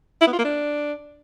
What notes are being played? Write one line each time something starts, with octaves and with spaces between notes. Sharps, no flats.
E4
B3
F4
A#3
D4